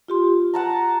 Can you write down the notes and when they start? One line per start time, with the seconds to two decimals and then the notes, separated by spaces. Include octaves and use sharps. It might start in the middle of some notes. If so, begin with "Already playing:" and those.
0.08 F4 G4 C6
0.54 F#5 A5 A#5